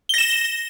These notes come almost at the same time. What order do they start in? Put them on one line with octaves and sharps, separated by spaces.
G7 A#6 E7